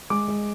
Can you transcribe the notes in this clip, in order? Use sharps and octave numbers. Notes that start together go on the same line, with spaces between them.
G#3 D6
G#3